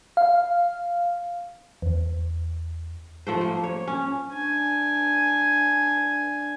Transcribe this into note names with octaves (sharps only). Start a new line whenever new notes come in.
F5
E2
F3 A3 C5
A#3
C#5
C#4
D4 G#5